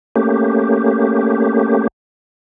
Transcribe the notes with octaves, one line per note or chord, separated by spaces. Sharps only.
A3 A#3 C#4 G4